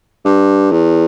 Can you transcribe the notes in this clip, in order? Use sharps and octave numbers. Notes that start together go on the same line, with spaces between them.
G2
E2